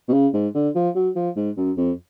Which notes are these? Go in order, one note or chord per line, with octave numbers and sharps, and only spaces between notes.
B2
C#3
G#2
D3
F3
F#3
F3
G#2
F#2
F2